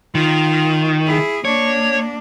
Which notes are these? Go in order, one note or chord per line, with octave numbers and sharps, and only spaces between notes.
D#3 F4
E4 G#4
A#3 D4 C#5